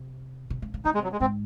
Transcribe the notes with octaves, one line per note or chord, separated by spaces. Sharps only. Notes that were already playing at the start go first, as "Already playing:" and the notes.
Already playing: C3
C3
C#3
C#3
C#3 D#4
G#3
C3
F#3
G#3
G#2 C4